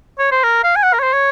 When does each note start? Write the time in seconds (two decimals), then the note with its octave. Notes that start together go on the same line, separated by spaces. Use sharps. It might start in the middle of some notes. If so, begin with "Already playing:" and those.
0.19 C#5
0.32 C5
0.44 A#4
0.64 F5
0.76 G#5
0.83 F#5
0.93 A#4
0.99 C#5
1.03 C5
1.14 C#5